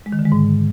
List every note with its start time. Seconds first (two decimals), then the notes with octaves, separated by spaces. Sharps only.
0.06 G#3
0.13 D#3
0.19 D3
0.25 G#3
0.32 G#2